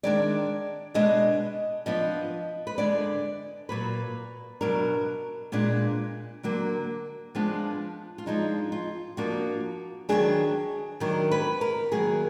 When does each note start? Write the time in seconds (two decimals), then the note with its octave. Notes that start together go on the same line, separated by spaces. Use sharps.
0.03 D#3 G#3 D4 D5
0.94 B2 G#3 B3 D4 D#5
1.86 F3 B3 D4 D#5
2.67 B4
2.78 D3 G#3 B3 D4 D5
3.69 A#2 F#3 A#3 B4
4.61 B2 F#3 B3 D4 A#4
5.52 A#2 G#3 B3 D4
6.43 D3 F#3 A#3 D4
7.35 F3 G#3 B3 D4 F4
8.18 F4
8.26 F3 G#3 D4 D#4
8.72 F4
9.17 F3 A#3 D4 F#4
10.09 D#3 F#3 B3 D4 G#4
11.00 D#3 F#3 D4 A#4
11.31 B4
11.61 A#4
11.91 D#3 F#3 A#3 G#4